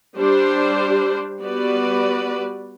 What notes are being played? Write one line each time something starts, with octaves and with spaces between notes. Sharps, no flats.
G3 D4 G4 C5
G3 B3 F#4 B4 D5